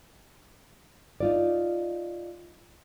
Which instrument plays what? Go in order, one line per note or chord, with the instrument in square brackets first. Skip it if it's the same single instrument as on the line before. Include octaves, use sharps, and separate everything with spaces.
[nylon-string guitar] D#4 F4 D5